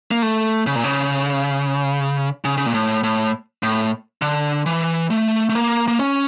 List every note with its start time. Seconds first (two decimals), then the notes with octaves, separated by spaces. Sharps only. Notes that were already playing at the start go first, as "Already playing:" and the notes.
0.11 A#3
0.22 A3
0.67 C#3
0.76 A#2
0.84 C#3
2.45 C#3
2.58 C#3
2.66 A#2
2.74 A2
3.04 A2
3.63 A2
4.22 D3
4.66 E3
5.10 A3
5.49 A3
5.55 A#3
5.88 A#3
5.99 C#4